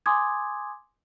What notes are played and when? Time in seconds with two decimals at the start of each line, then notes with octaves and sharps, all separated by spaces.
0.06 G#5 C6 D6 D#6 G#6